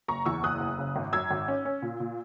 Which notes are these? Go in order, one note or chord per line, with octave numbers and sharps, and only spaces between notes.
F#1 A#5 C#6
E2 C#6 E6
F#1 D#6 F#6
F#1
C#3
G#1
F#2 E6 G#6
G#1
C#4
C#4
A#2
A#2